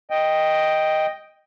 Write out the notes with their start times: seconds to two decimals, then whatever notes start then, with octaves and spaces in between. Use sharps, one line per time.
0.10 D#5 G5